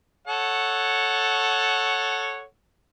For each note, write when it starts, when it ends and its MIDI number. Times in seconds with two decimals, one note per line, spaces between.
0.27 2.43 69
0.27 2.43 73
0.27 2.43 78